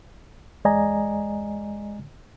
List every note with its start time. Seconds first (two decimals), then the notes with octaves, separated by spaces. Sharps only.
0.65 E2 G#3 D5 D#5 G#5 A#5